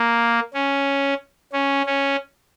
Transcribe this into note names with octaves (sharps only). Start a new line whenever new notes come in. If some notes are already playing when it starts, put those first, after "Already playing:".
Already playing: A#3
C#4
C#4
C#4